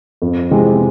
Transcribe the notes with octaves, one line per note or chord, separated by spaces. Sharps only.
F2
C3 E3 G#3 C4